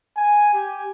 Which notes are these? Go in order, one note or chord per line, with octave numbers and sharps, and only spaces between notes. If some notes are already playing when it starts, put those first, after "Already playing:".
G#5
G4